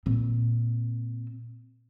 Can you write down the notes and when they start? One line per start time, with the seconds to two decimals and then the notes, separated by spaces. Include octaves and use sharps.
0.06 A#2 C4